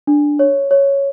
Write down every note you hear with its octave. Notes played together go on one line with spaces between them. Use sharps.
D4
C#5
C#5